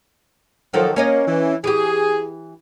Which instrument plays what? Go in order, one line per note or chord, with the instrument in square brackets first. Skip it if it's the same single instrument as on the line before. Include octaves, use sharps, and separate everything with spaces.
[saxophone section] D#3 F3 [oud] F#3 A4 A#4
[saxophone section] A#3 [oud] C#4 C#5 D#5
[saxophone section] E3
[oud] E3 G4 [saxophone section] G#4